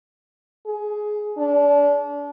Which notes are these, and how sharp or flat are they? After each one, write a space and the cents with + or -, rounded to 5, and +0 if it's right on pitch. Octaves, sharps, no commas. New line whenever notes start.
G#4 +15
D4 -30